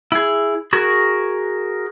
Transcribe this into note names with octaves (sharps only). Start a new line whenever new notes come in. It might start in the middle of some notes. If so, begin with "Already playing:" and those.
E4 G#4
F#4 G#4 A#4